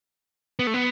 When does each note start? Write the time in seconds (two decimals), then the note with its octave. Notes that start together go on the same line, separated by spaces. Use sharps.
0.59 B3
0.67 A3
0.74 B3